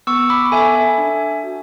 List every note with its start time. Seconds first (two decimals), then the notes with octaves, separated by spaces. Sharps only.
0.07 B3 C#6 E6
0.29 B5 D6
0.52 A4 E5 G#5
0.75 E5 G#5
0.98 D4
1.44 F#4